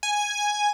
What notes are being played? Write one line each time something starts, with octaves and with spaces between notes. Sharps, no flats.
G#5